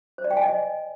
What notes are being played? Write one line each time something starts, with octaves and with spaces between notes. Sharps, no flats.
C5
D5
G5
G#5
D#5